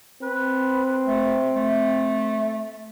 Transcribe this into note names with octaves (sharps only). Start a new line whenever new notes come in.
C4 B4
A3
A3